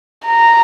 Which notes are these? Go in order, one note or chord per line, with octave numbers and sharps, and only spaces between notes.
A#5